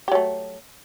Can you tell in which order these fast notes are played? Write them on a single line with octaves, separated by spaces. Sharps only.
G4 F#3 A3